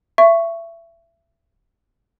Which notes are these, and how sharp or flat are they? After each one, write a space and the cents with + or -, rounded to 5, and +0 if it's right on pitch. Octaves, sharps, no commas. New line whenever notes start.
E5 +25 C#6 +0